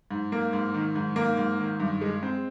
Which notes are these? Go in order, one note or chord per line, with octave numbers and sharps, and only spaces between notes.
G#2
A#3
G#2
D#3
G#2
A#3
G#2
D#3
G2
G#3
C4